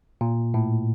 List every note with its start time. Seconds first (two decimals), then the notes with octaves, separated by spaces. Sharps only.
0.21 A#2
0.54 A2